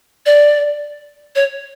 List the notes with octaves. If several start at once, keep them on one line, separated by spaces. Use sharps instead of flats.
D5
C#5